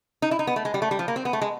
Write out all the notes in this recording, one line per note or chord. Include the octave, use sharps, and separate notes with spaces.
D#4
E4
D#4
B3
A3
G#3
G3
A3
G3
F3
A#3
C4
B3
A3
G#3